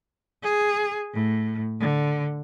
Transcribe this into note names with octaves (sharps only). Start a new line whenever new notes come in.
G#4
A2
D3